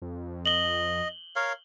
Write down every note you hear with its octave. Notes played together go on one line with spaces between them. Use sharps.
F2
D#5 F#7 G7
A#4 C#5 F5